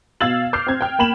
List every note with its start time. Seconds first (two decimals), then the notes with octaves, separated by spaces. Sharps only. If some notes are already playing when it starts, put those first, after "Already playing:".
0.20 B2 F5 E6 G#6 A6 F#7
0.53 D6 F6 G6 C7
0.67 C4 G#6
0.81 G5 F6
0.99 A#3 G5 B5 E7 F#7